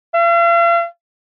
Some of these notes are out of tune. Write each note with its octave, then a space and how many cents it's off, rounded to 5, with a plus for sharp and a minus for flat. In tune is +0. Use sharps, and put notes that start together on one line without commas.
F5 -45